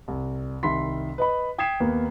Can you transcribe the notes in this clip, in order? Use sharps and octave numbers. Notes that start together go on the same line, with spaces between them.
C2
C2 D#3 E5 B5 C6 B6
B4 D#5 B5
G5 D#6 G#6 B6 C7 E7
D#2 A#3 B3